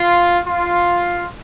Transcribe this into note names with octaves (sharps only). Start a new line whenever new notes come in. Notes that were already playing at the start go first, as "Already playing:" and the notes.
Already playing: F4
F4